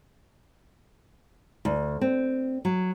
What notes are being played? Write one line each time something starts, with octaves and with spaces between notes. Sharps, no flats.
D2
C4
F#3